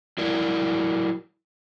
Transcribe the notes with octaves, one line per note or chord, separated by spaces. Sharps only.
F#3 E4 A#4 D5